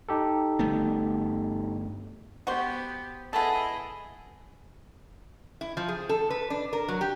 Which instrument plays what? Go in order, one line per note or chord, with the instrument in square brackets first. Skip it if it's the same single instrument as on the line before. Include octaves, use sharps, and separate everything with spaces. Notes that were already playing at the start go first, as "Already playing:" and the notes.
[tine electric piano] D#4 G4 A4
[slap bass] G1 A3 B3
[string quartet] B3 G4 [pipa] F#4 C5
[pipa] B3 A4 [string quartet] E4 G#4 D#5
[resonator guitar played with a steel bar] E4
F3
G#4
A4
B4
D4
A#4
F#3
G4